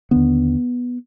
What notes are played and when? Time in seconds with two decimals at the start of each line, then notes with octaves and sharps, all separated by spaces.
0.11 D#2 D3 B3